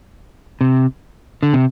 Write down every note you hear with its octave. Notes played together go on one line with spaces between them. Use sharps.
C3
D3
C3